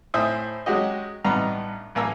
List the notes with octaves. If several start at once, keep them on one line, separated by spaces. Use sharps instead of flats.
A2 C5 E5 G#5 D#6
F#3 G#3 C#4 F#4 G4 D#5
A1 G2 B3 D#4 A#5
A1 A#3 G#5 A#5 E6